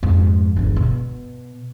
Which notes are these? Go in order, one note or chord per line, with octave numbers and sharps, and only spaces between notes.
F2 G#2
G1 E2
B2